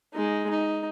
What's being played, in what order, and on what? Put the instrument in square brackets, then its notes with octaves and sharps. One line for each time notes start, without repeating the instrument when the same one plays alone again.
[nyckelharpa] G#3 D#4
D#4